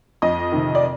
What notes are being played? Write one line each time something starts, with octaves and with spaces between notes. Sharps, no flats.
F2 D#5
C3 D#3
D5